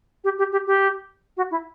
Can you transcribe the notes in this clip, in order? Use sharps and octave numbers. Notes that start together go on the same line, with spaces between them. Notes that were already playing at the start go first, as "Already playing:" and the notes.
G4
G4
G4
G4
F#4
E4